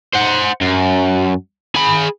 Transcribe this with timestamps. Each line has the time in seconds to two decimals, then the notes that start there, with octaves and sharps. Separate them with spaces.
0.14 C5 F#5
0.61 F#2
1.75 G#4 B5